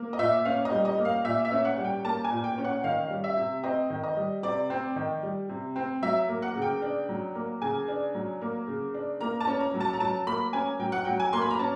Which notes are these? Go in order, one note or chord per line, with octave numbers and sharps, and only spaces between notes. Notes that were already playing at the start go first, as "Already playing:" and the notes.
Already playing: A#3
D#5
A#2 E5
C#4 F5
D#5
G3
D#5
A#3
F5
A#2 E5
E5
C#4
F#5
G3
G5
A#3 A5
G#5
A#2
G5
C#4
F#5
D#3 F5
G3
E5
C3
C4 D#5
D#3
D#5
G3
C3 D5
C4
D#3
G3
C3
C4
F#3 E5
A#3
F#5
C#3
G5
D4
F#3
A#3
C#3 G#5
D4
F#3
A#3
C#3
D4
A#3 A#5
A5
C#4
A#5
F#3
A5
A#5
F#3 A5
A#3 B5
C#4 G#5
F#3 G5
F#5
F#3 G5
G#5
A#3 C6
B5
A#5
C#4 A5